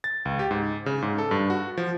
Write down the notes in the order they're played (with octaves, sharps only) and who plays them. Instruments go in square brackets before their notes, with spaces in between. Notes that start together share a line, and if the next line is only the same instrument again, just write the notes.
[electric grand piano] A6
C#2
G4
G#2
C#3
G#2
A4
G2
F#4
F3